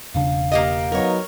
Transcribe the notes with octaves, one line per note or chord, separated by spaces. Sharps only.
E1 C#3 D4 F5
A#3 G4 D#5
F#3 B3 D#4 A#4 C#5